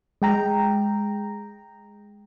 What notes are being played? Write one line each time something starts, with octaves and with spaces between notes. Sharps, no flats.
G#3 G5 A#5